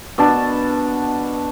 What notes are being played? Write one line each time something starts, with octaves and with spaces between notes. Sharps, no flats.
B2 D4 A5